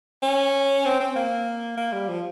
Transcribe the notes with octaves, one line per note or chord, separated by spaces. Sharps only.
C#4
C4
C4
A#3
A#3
G3
F3